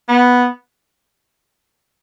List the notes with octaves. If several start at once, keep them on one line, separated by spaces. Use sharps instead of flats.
B3